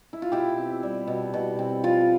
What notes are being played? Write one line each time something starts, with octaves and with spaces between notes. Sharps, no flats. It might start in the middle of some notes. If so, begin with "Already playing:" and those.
E4
F4
B2 E4 G4
C4
G3
B2
B2
C4
F3 F4